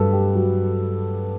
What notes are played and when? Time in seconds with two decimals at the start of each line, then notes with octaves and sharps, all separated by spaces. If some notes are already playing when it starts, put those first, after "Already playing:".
Already playing: G2 F#3 A4 B4
0.13 G4
0.35 F#3